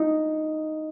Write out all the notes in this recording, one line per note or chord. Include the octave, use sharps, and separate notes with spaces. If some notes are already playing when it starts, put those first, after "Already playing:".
Already playing: D#4